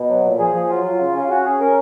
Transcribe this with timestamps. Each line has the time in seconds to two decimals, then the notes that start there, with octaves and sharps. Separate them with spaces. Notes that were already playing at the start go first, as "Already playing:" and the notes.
Already playing: B2
0.09 F#3
0.25 A#2
0.39 F3 G#4
0.54 F3
0.69 F#3 F4
0.84 F4
0.99 C#3
1.15 C#4 F4
1.29 C#4 F#4
1.44 C#4 G#4
1.60 C#4 A#4